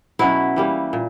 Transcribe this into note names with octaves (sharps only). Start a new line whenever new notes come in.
B2 F#3 C#4 E4
E3 G3 A#3
A#2